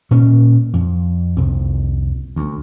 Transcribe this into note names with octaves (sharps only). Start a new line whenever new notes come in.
A#2 C#4
F2
C2 F2
D2